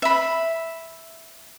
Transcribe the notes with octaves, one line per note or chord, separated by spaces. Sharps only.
E5 B5